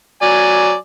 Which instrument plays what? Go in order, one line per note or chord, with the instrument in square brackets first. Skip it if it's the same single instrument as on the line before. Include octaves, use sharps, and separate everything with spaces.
[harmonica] F#3 D5 G#5